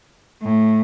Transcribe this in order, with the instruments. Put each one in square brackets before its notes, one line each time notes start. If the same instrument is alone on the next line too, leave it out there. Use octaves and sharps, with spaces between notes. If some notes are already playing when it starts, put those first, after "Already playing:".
[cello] A2